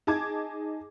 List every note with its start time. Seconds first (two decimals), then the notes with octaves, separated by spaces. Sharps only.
0.07 D#4 G#4 A5 D6 G#6